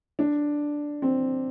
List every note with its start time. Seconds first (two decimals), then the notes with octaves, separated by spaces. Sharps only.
0.19 D4
1.02 C4